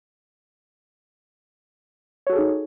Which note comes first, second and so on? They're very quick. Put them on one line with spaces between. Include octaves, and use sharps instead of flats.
C#5 F#4 A4 G#4 D#4